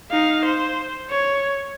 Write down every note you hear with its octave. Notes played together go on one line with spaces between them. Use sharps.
D#4 F5
C5
C#5